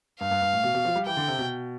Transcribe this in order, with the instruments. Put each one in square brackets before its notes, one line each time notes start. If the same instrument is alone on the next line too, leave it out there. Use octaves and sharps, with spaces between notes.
[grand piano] G2 [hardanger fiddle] F5
[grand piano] G2
G2
A2
B2
B2
F3
G3
[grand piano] E3 [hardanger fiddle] G5
[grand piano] D3
C3
B2